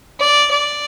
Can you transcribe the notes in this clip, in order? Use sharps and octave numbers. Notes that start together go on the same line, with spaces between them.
D5
D5